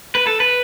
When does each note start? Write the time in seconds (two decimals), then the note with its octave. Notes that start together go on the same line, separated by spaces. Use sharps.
0.15 B4
0.27 A4
0.40 B4